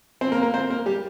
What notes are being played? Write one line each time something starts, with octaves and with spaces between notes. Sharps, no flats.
C4 C5
A#3 A#4
A#3 A#4
C4 C5
A#3 A#4
G3 G4